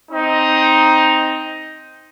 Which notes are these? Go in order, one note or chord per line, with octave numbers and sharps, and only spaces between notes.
C4 D#4